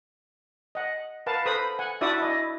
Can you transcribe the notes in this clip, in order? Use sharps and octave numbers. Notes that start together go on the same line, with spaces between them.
D#5 F#5
A#4 B4 F5 F#5 A5
A4 B4 C5 A#5 B5 D#6
F#5 G#5
D4 E4 F#4 D5 E5 D#6
E4 D#5